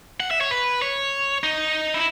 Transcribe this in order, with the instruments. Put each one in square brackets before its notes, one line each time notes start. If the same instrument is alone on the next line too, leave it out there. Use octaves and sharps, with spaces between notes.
[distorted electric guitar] F#5
E5
C#5
B4
C#5
D#4
E4